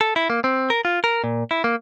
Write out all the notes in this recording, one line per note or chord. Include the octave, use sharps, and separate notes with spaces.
A4
E4
A#3
C4
A#4
F4
A#4
A#2
E4
A#3